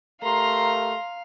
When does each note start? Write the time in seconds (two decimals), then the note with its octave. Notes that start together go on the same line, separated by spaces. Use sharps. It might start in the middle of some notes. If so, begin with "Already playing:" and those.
0.23 A3 G4 A#4 F5 A#5 C6